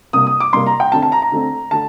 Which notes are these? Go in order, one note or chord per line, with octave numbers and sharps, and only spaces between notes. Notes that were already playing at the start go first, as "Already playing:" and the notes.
C3 G3 A#3 D#6
D#6
D6
C3 G3 A#3 C6
A#5
G5
D3 A3 C4 A5
A5
A#5
A#5
D3 A3 C4
D3 A3 A5